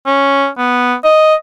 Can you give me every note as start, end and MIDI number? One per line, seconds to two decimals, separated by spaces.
0.06 0.48 61
0.58 0.94 59
1.04 1.35 75